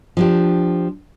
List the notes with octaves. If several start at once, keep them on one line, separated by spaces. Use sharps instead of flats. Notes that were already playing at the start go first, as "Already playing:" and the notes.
F3 D4 G4